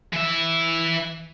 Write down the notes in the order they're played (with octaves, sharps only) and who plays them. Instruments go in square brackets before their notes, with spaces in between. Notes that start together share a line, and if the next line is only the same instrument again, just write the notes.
[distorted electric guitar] E3 E5